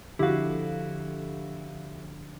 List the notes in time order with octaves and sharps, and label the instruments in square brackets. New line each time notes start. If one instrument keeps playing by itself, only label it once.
[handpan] D3 F3 D4 [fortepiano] E4 F#4 [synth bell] G4 F5